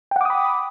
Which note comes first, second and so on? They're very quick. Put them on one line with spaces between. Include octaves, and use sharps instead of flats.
G5 F#5 D6 D#6 B5